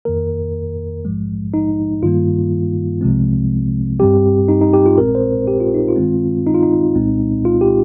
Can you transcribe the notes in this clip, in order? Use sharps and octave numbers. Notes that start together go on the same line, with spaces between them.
F2 D#3 A#3 A#4
A#1 G#2 F3 G#3
D#4
G2 D#3 G3 A#3 F4
C2 C3 F3 G#3 C4
G2 G3 C4 G4
D#4
D#4
G4
F4
A#1 A#2 G#3 C4 A#4
C5
G4
F4
D#4
F4
G2 D#3 G#3 C4
D#4
F4
D#4
C2 A#2 G#3 C4
F4
G4